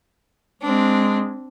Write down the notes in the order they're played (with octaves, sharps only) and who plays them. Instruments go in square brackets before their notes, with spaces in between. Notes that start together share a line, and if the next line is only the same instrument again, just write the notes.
[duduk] G#3 [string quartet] C4 D4